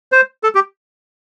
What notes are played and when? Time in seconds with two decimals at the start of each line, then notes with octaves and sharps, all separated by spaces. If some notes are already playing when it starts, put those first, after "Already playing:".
0.12 C5
0.43 A4
0.55 G4